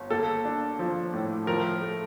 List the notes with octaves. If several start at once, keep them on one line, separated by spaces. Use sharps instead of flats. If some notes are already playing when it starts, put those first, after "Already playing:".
Already playing: G1
A#3 A4
D4
F3
A2
F3 A#4
A3